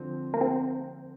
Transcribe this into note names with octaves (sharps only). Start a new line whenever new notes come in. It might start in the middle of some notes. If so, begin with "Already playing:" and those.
Already playing: D3 F3 C4
A#3
C4